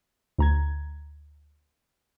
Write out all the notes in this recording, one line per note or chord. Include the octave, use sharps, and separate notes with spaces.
D2 A#5 G#6